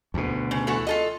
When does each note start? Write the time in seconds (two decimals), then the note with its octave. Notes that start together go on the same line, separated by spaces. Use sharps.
0.14 D2 B2
0.51 C#3
0.67 E3 A3 F#4
0.87 F4 A4 D#5